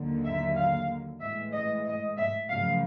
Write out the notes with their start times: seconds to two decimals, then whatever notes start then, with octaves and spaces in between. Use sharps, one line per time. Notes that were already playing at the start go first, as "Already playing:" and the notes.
Already playing: D#2 D3 F#3 A#3
0.25 E5
0.56 F5
1.20 A2 E3 G#3 E5
1.52 D#5
1.86 D#5
2.18 E5
2.50 F#2 C#3 F3 A3 F5